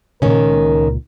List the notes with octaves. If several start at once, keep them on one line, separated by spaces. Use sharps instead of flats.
C#2 A#2 D#3 C#4 A#4